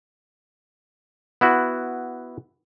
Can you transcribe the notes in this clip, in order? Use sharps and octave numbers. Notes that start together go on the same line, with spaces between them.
B3 E4 F#4